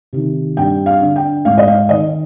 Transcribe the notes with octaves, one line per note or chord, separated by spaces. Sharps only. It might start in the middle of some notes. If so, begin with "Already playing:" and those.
C3 D#3
G2 G5
F5
D3
G5
G#2 F5
D#5
F5
D#3 D#5